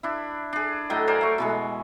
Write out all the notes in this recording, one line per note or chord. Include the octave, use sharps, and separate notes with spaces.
D4 E4
D4 G#4
A2 F#3 D#5 G5
A#4 C5 D5 G#5
A3 C#6
B2 E3 G#3